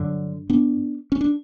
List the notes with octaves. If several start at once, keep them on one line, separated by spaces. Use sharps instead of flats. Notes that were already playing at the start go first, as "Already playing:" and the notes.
Already playing: G2 D3 F#3
B3 D4
C#4
D4